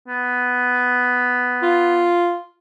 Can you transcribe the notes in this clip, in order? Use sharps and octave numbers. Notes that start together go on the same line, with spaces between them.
B3
F4